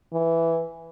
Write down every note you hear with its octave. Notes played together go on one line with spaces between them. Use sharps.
E3